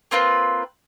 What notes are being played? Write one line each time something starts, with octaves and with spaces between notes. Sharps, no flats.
A#3 C4 F4 B4